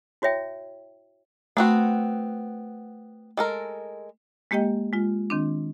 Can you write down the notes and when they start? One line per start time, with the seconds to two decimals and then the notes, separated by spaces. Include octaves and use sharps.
0.22 E4 F#4 C#5 E5 G5
1.57 A3 B3 C4 F#4
3.37 G#3 A4 A#4
4.51 G#3 A#3 G4 D#5 G5
4.93 G#3 F4
5.30 D#3 C4 D4